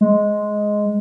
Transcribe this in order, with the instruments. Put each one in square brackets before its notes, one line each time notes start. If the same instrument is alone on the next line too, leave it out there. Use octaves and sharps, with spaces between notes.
[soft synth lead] G#3